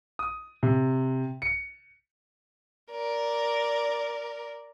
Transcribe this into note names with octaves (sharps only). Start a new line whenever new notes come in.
D#6
C3
C#7
A#4 D5